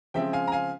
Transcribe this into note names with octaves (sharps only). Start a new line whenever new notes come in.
C#3 F3 G#3 C4 E5 G5
F5 G#5
A#5
F5 G#5